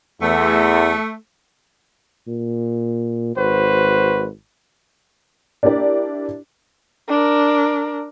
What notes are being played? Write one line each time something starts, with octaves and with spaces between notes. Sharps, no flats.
E2 A3
A#2
G#1 F#4 B4 C5
D4 E4 G4 A#4 D5
D4 A#4